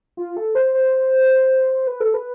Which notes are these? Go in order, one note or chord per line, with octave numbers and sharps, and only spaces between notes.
F4
A4
C5
C5
B4
A4
B4